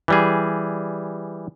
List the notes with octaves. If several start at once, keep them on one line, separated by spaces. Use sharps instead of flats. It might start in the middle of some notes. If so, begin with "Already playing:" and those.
E3 G3 G#4